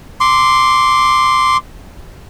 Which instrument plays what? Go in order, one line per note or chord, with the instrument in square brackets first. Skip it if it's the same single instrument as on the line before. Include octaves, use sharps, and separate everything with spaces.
[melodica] C6 D6